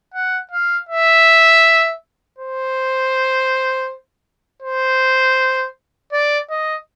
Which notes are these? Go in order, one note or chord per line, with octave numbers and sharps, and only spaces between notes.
F#5
F5
E5
C5
C5
D5
D#5